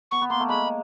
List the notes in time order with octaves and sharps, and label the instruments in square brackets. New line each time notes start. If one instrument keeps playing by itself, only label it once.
[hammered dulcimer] B3 [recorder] C#6
[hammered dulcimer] B3
[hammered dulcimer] A#3 [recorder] C6
[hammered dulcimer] A3
[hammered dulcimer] G#3 [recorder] B5